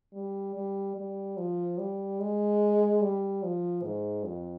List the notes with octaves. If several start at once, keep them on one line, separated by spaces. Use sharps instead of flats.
G3
G3
G3
F3
G3
G#3
G3
F3
G#2
F2